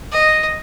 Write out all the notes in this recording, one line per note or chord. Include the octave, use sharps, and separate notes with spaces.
D#5